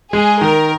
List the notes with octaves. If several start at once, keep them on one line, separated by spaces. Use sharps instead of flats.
G#3 G#4
D#3 A#4